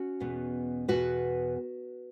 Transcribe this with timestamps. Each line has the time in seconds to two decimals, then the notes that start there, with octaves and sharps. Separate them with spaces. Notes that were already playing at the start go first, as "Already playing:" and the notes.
Already playing: C#4 F#4
0.20 E2 B2 B3
0.88 E2 B2 B3 F#4 B4